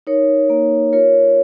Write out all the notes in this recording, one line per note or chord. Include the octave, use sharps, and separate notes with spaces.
D#4 A#4 C#5
A#3
F4 A#4 C#5